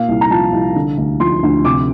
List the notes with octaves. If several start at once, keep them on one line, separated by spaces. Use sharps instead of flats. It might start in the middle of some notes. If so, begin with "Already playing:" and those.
Already playing: A#2 F5
C2
A#5
F3 A5
C2
D3
D2
F3 C6
D2
C3 D6